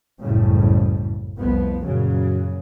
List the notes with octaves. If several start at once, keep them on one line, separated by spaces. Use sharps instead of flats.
F#1 C2 F2 A2 C#3 G3
F1 C2 F3 B3
F#2 A#2 C#3 F#3